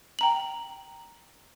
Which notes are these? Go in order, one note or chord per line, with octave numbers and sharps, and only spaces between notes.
G5 A#5 F#7